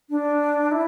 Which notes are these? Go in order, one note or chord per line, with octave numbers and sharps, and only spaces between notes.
D4
E4